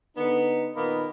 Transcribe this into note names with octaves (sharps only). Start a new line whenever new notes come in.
D3 B3 D#4
A#2 D#3 A#3 B3 D#4 B5